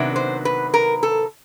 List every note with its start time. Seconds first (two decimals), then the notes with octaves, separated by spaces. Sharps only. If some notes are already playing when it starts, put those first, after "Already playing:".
Already playing: C3 D#3 F#3 B3 D4
0.16 C5
0.45 B4
0.74 A#4
1.03 A4